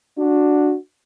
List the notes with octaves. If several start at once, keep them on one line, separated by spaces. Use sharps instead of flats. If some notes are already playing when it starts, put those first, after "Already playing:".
D4 F#4